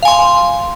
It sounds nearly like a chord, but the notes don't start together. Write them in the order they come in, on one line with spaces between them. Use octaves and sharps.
F5 G#5 C6